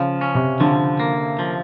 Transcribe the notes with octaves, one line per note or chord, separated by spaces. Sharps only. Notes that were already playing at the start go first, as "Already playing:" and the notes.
Already playing: C#3 F3
C#4
C3
D3 F3
A#3
F3